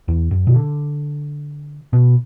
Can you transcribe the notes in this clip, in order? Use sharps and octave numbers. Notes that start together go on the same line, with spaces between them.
E2
F#2
B2
D3
B2